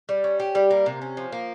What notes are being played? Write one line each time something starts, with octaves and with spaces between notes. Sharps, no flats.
G3
C#4
G4
G3
A#3
C3
C#4
F3
A#3